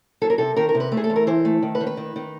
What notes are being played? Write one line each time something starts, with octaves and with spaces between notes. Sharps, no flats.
F#3 A4
A#4
C3 A4
D#3 A#4
A#4
C3
B4
A3
G#4
A4
E2
A#4
E3 C5
A3
D#3
B4
D#3
B4
D#3
D#3